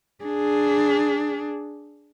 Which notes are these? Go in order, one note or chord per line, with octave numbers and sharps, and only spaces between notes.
D4 G#4